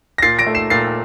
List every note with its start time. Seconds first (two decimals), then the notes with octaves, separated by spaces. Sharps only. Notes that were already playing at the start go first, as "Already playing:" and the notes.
0.18 A#6
0.22 A#2 A6 C7
0.39 A#6 D7
0.47 A3
0.55 C7 E7
0.70 A#2 A6 C7